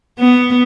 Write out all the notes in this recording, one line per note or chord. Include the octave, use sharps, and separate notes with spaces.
B3